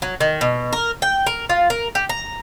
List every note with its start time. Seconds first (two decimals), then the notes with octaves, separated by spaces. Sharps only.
0.02 F#3
0.21 D#3
0.41 B2
0.73 A#4
1.02 G5
1.27 A#4
1.49 F4
1.70 A#4
1.95 G4
2.09 A#5